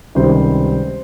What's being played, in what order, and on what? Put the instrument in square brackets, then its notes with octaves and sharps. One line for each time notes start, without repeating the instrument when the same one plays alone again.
[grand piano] C#2 C3 D#3 G3 C5